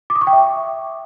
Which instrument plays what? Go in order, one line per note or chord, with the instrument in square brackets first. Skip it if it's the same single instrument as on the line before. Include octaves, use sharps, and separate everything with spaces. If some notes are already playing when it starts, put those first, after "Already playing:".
[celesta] D6
D#6
C#6
G5
E5